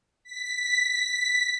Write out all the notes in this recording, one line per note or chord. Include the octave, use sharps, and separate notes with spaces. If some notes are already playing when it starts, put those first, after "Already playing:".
B6